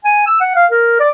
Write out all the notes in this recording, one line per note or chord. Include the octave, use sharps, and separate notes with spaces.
G#5
E6
F#5
F5
A#4
D5